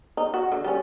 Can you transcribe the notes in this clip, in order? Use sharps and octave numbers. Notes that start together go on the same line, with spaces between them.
D#4
F#4
D3
G3 C#4